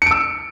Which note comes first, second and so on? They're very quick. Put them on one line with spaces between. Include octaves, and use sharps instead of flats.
C#7 D7 E6